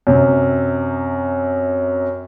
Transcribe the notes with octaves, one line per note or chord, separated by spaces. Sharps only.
F#2 C3